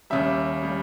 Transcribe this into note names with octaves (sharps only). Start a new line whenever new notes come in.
D#2 C#3 G3 E5
C#3 G3